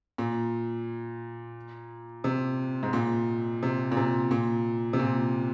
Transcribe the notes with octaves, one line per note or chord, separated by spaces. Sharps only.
A#2
C3
G#2
A#2
C3
A#2
C3
A#2
C3
A#2